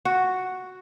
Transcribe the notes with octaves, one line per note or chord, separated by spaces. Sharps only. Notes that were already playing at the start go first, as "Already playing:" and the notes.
F#4